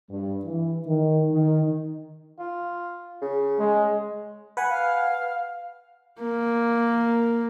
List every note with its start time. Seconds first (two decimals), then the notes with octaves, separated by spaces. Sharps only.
0.10 G2
0.45 E3
0.86 D#3
1.33 D#3
2.39 F4
3.22 C#3
3.59 G#3
4.57 B4 F#5 G#5
4.70 F5
6.22 A#3